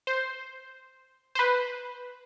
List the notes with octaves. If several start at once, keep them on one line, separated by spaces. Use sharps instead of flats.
C5
C5
B4